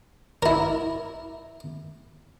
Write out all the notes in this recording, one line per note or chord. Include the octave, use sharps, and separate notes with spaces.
E4 A#4